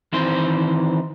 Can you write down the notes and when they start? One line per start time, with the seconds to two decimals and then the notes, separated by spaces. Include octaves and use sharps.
0.13 D#3 E3 C4 C5